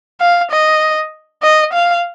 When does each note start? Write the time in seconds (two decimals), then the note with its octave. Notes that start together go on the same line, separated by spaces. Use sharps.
0.20 F5
0.52 D#5
1.43 D#5
1.73 F5